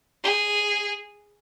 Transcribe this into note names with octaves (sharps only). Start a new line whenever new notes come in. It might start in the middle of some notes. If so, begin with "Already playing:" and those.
G#4